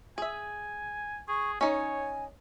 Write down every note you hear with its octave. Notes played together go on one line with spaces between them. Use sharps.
G#4 E5 G#5
G#4 C#6
C#4 D#4 C#5 G#5